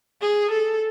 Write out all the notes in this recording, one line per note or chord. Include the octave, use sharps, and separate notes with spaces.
G#4
A4